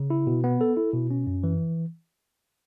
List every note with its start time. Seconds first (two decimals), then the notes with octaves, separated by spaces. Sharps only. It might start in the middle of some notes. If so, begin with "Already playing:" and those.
Already playing: C#3
0.10 E4
0.27 B2
0.44 B3
0.61 A4
0.77 E4
0.94 B2
1.10 C#4
1.27 F#2
1.43 E3